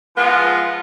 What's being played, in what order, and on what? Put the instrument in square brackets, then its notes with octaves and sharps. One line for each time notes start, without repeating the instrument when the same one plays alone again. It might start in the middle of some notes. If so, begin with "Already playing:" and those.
[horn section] F3 G#3 B3 F4